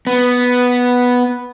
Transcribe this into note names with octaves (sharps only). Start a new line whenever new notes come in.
B3